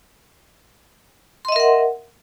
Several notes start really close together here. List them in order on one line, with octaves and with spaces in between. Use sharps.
C6 D#5 E5 A#4 F#5